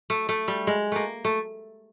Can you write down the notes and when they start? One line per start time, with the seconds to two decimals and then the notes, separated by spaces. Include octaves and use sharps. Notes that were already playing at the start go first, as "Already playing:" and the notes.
0.10 A3
0.29 A3
0.48 G3
0.67 G#3
0.92 A3 A#3
1.25 A3